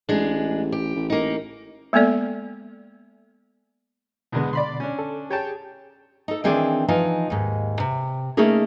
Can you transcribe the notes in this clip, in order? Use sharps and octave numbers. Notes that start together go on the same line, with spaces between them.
A1 G#3 D4
G4
A1
A#3 D#4
G#3 A#3 B3 A4 D5
E2 B2 D3 G#3 B3
D5 B5 C6
C#4 D4
A4
G4 G#4 C#5 G5 A5
D#4 A4
D#3 E3 C4 D4 G#4 D5
E3 F3 D#4 F4
D#2 G#2
C3
A3 A#3 C#4 D#4 G#4 A#4